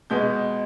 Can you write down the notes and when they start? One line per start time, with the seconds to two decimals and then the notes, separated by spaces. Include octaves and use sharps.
0.10 B2 G#3 B3 G6